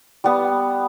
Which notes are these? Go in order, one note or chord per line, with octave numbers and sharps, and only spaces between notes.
G3 B3